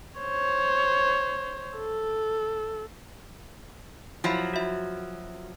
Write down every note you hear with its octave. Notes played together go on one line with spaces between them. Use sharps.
C5 C#5
A4
F3 F#3 E4 E5 B5
F#4 E5